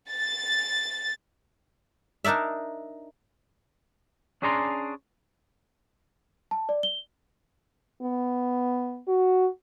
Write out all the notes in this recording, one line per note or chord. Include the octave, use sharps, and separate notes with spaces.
A6
D4 D#4 A#4 D5 E5
C#4 D4 G#4 D5 A#5 C6
A5
D5
G7
B3
F#4